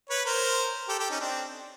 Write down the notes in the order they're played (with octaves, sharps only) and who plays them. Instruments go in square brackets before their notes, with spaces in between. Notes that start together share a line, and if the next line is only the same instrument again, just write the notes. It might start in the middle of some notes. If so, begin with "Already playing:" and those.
[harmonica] B4 C#5
A#4 C5
G4 A4
G4 A4
C#4 D#4
C4 D4